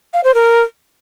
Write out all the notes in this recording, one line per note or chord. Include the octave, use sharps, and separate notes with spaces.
F5
C5
A#4